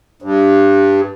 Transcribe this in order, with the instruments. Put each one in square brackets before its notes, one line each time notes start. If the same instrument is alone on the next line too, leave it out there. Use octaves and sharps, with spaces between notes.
[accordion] G2